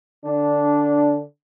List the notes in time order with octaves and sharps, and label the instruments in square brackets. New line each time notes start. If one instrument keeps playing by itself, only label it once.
[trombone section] D3 D4